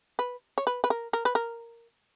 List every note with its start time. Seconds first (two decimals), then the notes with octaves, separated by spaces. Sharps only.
0.19 B4
0.58 C#5
0.67 B4
0.84 B4
0.90 A#4
1.13 A#4
1.25 B4
1.35 A#4